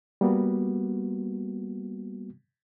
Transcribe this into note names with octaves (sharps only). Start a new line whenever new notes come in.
G3 A#3 B3 F#4